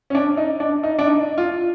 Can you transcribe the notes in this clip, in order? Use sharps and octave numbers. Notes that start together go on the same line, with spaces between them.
C#4
D4
D#4
D4
D#4
D4
D#4
F4